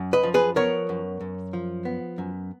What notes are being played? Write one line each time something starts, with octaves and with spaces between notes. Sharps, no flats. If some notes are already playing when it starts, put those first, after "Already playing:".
Already playing: F#2
B4 D#5
F3
G#4 B4
B3 A#4 C#5
F#2
F#2
F3
B3
F#2